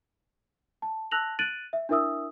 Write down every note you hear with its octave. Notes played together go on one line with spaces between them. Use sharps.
A5
A5 E6 F#6 A#6 F7 F#7
F#6 A6 D7 D#7 F#7
E5
D4 E4 A#4 E5 D#6 E6